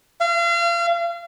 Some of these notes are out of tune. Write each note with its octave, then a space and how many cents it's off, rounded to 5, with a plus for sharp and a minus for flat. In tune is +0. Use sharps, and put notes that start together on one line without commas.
F5 -35